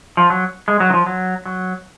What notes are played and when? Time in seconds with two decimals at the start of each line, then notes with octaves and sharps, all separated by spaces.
0.17 F3
0.30 F#3
0.68 G#3
0.80 F#3
0.90 D#3
0.94 F3
1.07 F#3
1.46 F#3